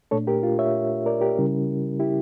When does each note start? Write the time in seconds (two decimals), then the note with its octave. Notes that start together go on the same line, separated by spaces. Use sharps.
0.11 A#2 A3 D4 A4 C#5
0.27 G4 A#4
0.43 F4
0.59 C#5 E5
1.06 A#4 D5
1.21 G4 A#4
1.37 C#3 G3 C#4 E4
2.00 E4 G4